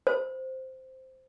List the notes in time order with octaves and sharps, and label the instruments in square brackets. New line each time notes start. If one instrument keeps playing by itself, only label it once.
[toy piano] C5